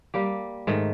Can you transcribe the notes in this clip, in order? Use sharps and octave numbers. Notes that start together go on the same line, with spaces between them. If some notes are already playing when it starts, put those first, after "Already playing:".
G3 A#3 G4
G#2 D#3 A3